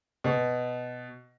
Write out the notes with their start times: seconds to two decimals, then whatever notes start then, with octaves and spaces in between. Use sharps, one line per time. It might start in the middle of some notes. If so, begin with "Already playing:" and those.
0.24 B2